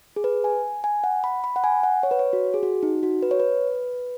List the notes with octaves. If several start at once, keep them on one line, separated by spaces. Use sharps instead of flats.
G#4
B4
G#5
G#5
F#5
B5
B5
F#5
G#5
F#5
C#5
B4
C#5
F#4
G#4
F#4
D#4
F#4
B4
C#5
B4